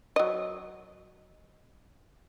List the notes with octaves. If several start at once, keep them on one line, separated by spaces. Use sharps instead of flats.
F#3 D#5